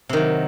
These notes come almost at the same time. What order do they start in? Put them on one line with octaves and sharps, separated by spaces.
C3 D#3 F#3